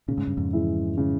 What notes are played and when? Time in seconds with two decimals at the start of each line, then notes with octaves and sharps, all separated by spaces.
0.08 A#2 C#3
0.18 G#2
0.27 G2
0.37 F2 G#2
0.53 E3 G#3 E4
0.98 C#3